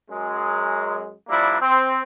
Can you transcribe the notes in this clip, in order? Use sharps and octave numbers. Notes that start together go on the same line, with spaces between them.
F#2 G#3
F3 G3 A#3 D4 E4
C4